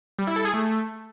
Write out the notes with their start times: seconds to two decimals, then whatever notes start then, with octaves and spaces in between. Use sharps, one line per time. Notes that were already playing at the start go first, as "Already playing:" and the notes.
0.19 G3
0.27 E4
0.36 A4
0.45 G#4
0.54 A3